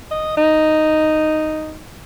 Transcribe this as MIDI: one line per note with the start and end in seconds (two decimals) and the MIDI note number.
0.11 0.36 75
0.37 1.81 63